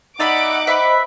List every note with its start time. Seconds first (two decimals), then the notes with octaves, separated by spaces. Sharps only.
0.20 D#4 D5 E5 F#5 B5 D6
0.67 B4 C5 D#5 E5 B5